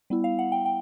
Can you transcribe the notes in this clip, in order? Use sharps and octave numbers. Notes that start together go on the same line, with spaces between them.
G3 B3 E4
F5
F#5
G5
G5